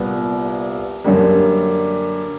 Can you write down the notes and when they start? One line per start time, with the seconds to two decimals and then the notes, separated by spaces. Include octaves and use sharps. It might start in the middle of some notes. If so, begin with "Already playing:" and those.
Already playing: C2 A#2 G3 B3
1.04 F#2 D3 G3 A#3